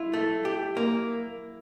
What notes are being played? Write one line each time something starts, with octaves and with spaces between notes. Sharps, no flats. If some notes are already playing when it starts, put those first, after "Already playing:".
Already playing: E4 F4
A3
G4
A#3